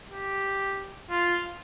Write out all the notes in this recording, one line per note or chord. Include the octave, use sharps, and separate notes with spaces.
G4
F4